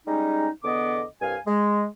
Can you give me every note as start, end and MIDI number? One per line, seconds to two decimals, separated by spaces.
0.07 0.49 55
0.07 0.49 56
0.07 0.49 61
0.07 0.49 63
0.64 1.03 40
0.64 1.03 50
0.64 1.03 59
0.64 1.03 75
0.64 1.03 86
1.22 1.37 36
1.22 1.37 43
1.22 1.37 77
1.22 1.37 80
1.47 1.85 56